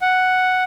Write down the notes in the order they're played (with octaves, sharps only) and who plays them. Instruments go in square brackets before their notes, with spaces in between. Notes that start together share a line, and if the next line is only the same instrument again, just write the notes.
[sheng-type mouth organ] F#5